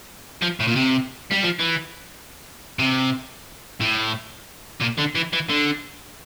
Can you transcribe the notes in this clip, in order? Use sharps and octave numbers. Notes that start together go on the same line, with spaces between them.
F3
A2
A#2
C3
G3
F3
E3
C3
A2
A#2
D3
E3
E3
D3